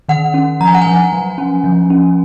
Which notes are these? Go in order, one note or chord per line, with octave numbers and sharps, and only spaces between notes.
D#3 F#5
C#4
F3 A#5
G#5
F#5
F3 G#5
F#3
C#4
F3
C#4